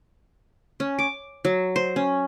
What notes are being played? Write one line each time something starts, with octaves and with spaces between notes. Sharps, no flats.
C#4
D6
F#3
C5
C#4